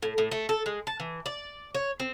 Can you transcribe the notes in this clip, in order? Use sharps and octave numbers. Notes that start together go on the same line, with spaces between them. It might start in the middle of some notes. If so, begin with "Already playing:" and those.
A2
A2
A3
A4
G#3
A5
E3
D5
C#5
C4